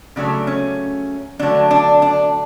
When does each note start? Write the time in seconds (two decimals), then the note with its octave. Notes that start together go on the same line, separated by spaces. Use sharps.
0.16 C#3 F#3 A3 D4
0.47 C#4
1.39 D3 F#3 A3 D4
1.71 D4
2.02 D4